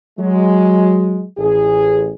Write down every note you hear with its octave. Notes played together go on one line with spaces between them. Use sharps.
F#3 G#3
A1 G#4